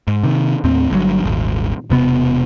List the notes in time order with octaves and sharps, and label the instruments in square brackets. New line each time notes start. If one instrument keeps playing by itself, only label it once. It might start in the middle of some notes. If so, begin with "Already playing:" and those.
[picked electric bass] G#2
C3 D#3
D#2 A2 C4
G1 G2 B2 F#3
D#1 G#1
E1 C3 B3